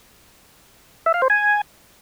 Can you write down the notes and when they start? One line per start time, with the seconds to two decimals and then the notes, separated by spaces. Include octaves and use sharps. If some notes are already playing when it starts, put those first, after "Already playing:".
1.06 E5
1.14 F5
1.22 C5
1.30 G#5